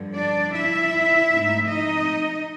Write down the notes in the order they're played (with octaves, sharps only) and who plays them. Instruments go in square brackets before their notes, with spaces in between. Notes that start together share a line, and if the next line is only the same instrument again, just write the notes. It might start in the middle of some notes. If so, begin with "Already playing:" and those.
Already playing: [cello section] G2 D3 F3
D4 D5
E4 E5
G#2 F3 A3 C4 D#4
D#4 D#5